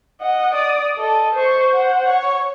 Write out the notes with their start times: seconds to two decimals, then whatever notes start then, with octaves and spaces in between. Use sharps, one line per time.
0.21 D#5 F#5
0.54 D5 D#6
0.97 A4 D#5
1.35 C5 C#6
1.72 C5 F#5
2.08 C#5